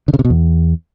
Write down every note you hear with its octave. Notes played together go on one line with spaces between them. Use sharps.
D3
C#3
C3
B2
E2